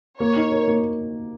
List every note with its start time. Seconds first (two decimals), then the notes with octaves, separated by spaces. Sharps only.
0.20 A#3 C#5
0.36 D#4
0.52 A#4
0.68 A#3